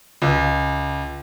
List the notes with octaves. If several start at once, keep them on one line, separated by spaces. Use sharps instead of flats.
C#2